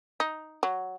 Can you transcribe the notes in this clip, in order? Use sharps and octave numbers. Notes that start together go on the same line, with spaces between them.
D#4
F#3